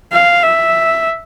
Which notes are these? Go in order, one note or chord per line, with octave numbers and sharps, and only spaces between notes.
F5
E5